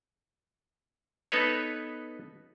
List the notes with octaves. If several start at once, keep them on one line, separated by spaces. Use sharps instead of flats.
B3 D#4 A4 B4 C#5